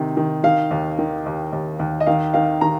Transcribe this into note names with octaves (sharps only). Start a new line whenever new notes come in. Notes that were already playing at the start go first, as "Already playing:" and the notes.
Already playing: C3 D#3
D#3
D#3 F5
D#2
D#3
D#2
D#2
D#2
D#5
D#3 F5
D#3 F5
D#3 A#5